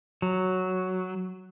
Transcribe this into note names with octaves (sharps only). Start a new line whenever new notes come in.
F#3